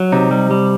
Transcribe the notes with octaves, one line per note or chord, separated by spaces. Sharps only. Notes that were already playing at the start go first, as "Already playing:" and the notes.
Already playing: F#3
C3 D#4
G3
G3